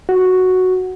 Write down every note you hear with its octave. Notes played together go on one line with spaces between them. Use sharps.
F#4